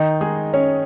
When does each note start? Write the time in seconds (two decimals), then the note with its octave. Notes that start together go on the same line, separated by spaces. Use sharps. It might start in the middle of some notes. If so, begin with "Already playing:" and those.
Already playing: D#3 D#4
0.21 G#3 G#4
0.53 C#4 C#5